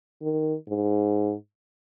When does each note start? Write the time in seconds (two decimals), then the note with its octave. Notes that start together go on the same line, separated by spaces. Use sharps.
0.22 D#3
0.68 G#2